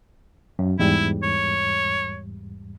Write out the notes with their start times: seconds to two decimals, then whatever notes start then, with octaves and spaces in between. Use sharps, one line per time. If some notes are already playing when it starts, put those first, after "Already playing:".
0.59 F#2
0.79 E2 G#2 G3 E4
1.23 C#5